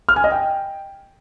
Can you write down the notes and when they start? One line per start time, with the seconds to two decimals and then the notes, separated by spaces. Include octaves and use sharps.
0.09 F6
0.16 G#5
0.24 D#5
0.32 G5